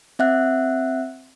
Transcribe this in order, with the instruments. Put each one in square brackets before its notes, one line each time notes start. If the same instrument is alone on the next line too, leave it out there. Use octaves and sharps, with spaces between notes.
[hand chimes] C4 E5 F#5 F#6